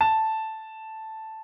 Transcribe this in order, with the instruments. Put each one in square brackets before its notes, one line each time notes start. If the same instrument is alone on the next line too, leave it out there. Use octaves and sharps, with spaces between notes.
[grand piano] A5